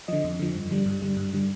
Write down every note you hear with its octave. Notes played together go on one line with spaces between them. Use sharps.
D3 F3 D#5
F2
D3 F3
G2
D3 G3
G2
D3 G3
G2
D3 G3